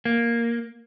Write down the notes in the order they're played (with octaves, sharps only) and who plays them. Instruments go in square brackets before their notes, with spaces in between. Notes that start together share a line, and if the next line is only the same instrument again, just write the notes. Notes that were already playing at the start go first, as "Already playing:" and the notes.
[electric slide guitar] A#3